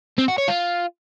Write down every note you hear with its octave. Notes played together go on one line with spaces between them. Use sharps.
C4
F#4
C#5
F4